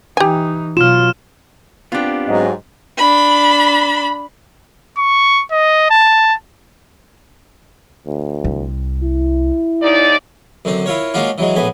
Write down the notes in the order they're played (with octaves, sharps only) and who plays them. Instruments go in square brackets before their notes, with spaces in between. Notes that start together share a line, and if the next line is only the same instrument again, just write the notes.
[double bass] E3 D#4 [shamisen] G4 G#5
[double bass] B2 F#3 [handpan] F4 [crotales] F6 E7
[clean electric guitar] B3 C4 D4 [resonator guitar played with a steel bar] F4 G4
[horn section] G#2 [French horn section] F#3 D#5
[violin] D4 B5
[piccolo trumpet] C#6
D#5
A5
[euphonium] D2
[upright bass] C2
[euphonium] E4
[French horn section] D#2 D#4 D5
[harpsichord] F#2 D3 C4
E4 F4 A#4 C#5
G#3 A#3 C#4 F4 F#4
E3 F#3 G#3
A#1 A2 B3 G#5